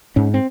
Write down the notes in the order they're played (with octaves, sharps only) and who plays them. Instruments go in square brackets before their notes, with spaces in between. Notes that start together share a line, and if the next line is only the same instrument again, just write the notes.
[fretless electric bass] G#2 C#4
C4